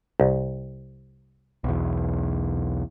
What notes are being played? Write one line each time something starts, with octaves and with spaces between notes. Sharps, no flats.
C2
B1 E2